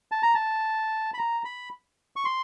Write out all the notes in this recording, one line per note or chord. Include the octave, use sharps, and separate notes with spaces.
A5
A#5
A5
B5
A#5
B5
C#6
C6